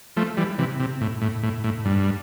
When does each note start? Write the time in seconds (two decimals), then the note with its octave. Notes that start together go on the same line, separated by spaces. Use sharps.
0.17 F3 A3
0.37 E3 G3
0.58 C3 E3
0.80 C3
1.01 A2
1.22 A2
1.43 A2
1.64 A2
1.85 G2